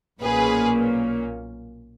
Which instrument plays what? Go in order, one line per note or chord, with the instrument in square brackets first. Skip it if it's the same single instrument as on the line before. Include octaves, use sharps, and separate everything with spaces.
[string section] B1 A#2 A#3 C#4 G#4 B4